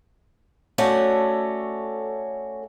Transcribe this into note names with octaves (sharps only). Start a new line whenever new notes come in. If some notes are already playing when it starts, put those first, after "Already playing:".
A3 C#4 F#4 A4 C#5 D5